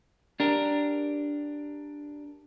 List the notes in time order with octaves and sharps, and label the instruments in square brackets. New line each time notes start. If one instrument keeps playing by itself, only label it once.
[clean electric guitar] D4 G4 A#4